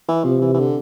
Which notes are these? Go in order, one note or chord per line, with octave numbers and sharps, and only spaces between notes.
E3
C3 F3
E3
E3
D3